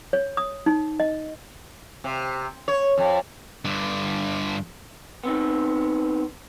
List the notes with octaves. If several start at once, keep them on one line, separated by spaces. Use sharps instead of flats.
C#5
D#6
D#4
D#5
C3
C#5
F2
G2 D3
B3 C4 D#4